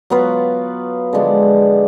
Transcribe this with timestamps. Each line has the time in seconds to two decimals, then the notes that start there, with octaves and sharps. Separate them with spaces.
0.10 F#3 B3 F4 B4
1.13 D3 F3 G#3 D4